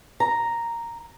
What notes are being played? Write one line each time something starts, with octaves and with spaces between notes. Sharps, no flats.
A#5